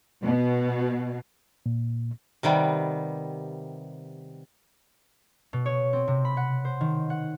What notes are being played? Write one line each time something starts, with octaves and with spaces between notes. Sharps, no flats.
B2
A#2
C3 D#3 G3 B3
B2
C#5
C4
C3
B5
F#5
C5
D#3
F#5